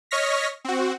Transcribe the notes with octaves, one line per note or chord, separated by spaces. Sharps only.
C#5 D#5 C#6 F6 A#6 B6
C4 F#4